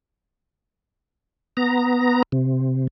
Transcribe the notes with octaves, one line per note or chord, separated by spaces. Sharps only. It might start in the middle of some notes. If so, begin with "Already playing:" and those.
B3 A#5
C3